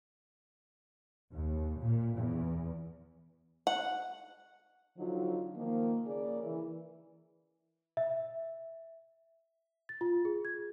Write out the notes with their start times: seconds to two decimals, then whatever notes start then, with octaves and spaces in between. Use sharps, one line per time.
1.32 D#2
1.80 A#2
2.18 E2
3.67 F#5
4.97 D3 F3 F#3 D#4 F4
5.56 D#3 F3 A#3
6.05 C#3 A#3 G#4 A#4 D5
6.43 E3
7.97 E5
9.89 A6
10.01 F4
10.25 G#4
10.45 G#6